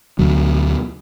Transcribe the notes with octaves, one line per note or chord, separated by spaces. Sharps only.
D2 B2 F#3